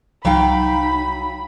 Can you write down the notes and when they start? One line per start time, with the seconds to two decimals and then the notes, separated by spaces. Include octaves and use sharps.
0.25 C2 F#3 D#4 F5 G5 B5